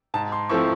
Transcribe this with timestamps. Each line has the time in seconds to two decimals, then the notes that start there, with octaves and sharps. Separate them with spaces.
0.14 G#2 A5
0.32 C6
0.49 F3 A3 C4 E4 C#6